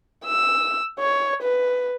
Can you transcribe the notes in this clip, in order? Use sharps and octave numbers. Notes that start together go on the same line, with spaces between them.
E6
C#5
B4